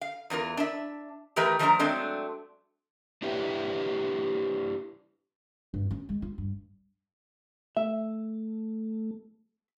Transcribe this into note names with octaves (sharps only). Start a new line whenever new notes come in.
F5
E2 E3 F4 A#4
D4 E5
D#3 E3 A3 G4 A#4 B4
D#3 F3 A3 D4 A#4 A#5
F#3 G#3 A3 C4 D4
D4 E4 G4 B4 E5
G2
C#4
G#3
F4
G2
A3 E5